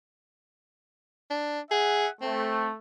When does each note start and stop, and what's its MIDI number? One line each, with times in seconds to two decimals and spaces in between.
1.30 1.60 62
1.71 2.07 68
1.71 2.10 76
1.71 2.10 78
2.22 2.76 57
2.22 2.68 60